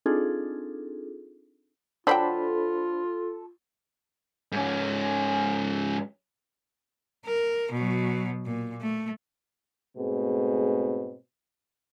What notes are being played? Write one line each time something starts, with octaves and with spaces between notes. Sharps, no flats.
C4 D4 D#4 F4 G#4 A4
D3 F#3 D4 F4 A4 C5 G5 B5
G#2 C#4
A#4
B2 F#3
A#2
A3
G#2 B2 A3 C4 G#4